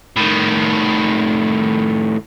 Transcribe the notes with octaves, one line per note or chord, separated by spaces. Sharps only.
A2 D#3